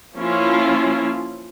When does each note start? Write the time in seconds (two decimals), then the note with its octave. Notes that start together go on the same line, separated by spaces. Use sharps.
0.16 F3 A#3 C#4 E4 F4